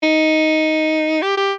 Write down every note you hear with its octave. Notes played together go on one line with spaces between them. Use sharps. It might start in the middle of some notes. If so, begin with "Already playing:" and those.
D#4
G4
G4